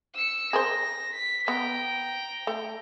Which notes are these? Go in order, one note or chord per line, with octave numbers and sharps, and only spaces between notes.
E6 C#7
G#4 A#4 C5 A#6
B6
B3 G5 A#5
A3